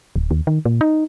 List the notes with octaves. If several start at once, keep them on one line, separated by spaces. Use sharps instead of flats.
D1
D#2
D#3
A#2
D#4